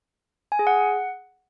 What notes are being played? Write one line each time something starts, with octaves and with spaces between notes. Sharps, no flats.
G#5
G#4
F#5